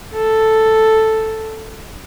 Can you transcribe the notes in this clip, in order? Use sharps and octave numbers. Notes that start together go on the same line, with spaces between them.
A4